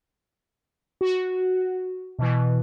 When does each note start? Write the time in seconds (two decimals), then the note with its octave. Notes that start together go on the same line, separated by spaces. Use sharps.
1.01 F#4
2.19 B2 E3